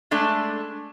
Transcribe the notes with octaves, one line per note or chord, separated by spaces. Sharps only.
G#3 A3 D4